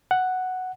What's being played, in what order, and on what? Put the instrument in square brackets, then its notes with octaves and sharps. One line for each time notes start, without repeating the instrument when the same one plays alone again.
[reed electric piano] F#5